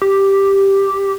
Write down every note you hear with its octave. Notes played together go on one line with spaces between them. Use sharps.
G4